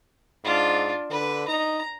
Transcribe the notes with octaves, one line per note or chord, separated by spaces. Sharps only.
G#2 D4 F4
D3 B4
D#4 A#5